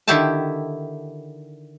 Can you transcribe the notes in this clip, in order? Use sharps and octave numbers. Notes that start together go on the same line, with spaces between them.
D3 D#3 E4 G4 E5 A5